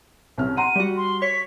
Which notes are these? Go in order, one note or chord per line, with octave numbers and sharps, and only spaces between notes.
C2 C#4 F6
F#5 A#5 C6 D#7
G3 F#4 D5
C6
C#5 B6